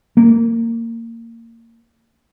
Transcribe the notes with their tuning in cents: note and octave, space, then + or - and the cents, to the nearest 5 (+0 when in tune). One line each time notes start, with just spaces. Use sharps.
A#3 -25